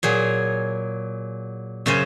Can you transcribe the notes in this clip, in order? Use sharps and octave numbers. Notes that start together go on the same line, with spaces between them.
A#2 F#3 G#4
F#2 C#3 C#4 C5